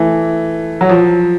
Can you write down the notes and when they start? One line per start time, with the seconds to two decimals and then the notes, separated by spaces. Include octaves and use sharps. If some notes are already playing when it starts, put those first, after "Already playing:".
Already playing: E3 A3
0.81 F#3
0.89 F3